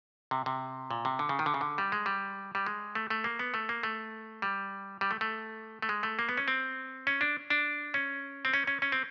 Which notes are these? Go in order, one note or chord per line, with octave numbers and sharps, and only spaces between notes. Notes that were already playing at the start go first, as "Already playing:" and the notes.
C3
C3
A#2
C3
D3
C#3
D#3
D3
C#3
D3
G3
G#3
G3
G3
G#3
A3
A3
A#3
B3
A3
A#3
A3
G3
G3
A3
A3
A3
G#3
A3
A#3
B3
C#4
C4
C#4
D4
D4
C#4
C4
C#4
C#4
C#4
C4